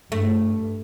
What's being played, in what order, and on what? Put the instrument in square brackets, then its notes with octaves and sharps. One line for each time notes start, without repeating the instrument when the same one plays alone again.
[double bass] G2 [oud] A3